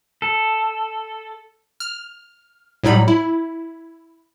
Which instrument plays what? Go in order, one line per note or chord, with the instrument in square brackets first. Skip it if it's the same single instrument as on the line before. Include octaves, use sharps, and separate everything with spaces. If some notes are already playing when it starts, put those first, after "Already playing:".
[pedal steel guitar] A4
[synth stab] F6
A2 F#3 G3 D#4 B5
E4